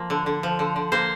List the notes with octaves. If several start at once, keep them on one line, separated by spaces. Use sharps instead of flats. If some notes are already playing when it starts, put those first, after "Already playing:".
Already playing: F3 A#3
D3
D3
F3
D3
D3
A#3 C5